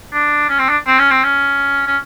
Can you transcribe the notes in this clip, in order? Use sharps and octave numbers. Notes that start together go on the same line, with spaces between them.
D4
C#4
C4
D4
C4
C#4
C4
C#4
C#4